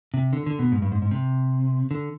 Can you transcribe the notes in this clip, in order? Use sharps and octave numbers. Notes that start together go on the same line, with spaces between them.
C3
D3
D3
B2
G#2
G2
G#2
G#2
C3
D3